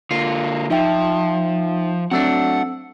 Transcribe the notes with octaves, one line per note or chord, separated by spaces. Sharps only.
D3 A#3 F4
F3 D#4 E5 G5
F#3 A3 C4 D4 F#5 E6